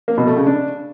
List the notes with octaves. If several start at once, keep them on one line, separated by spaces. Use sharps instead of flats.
A#3
B2
A3
C#3
D4